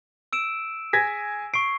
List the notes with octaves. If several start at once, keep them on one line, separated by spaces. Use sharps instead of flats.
E6 D7 E7
G#4 G#5 G#6 A#6 B6
C#6 C7 D7